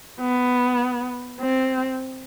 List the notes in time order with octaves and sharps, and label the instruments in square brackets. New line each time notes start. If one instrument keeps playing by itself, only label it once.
[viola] B3
C4